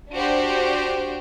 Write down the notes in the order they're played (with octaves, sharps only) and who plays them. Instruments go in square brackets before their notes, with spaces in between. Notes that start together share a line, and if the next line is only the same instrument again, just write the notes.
[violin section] D4 F#4 G4 C5